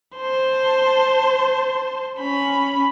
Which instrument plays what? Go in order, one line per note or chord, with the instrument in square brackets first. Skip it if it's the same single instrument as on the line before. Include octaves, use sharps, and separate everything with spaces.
[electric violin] C5 A5
C#4 B5